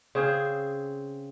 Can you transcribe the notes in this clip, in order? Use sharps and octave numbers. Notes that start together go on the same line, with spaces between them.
C#3 C4 G#4 C5